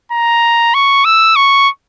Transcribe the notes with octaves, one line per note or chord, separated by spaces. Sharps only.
A#5
C#6
E6
C#6